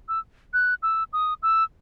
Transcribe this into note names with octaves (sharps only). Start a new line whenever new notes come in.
E6
F#6
E6
D#6
E6